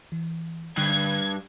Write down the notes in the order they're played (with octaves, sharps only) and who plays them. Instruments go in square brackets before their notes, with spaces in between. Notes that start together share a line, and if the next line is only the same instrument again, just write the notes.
[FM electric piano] E3
[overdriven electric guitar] G2 [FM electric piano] D3 B5 F#6 [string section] G#6